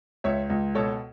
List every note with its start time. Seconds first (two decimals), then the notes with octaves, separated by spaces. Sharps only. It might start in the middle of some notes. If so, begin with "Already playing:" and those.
0.24 C#2 C#5 E5
0.50 C#2
0.75 B2 A4 C#5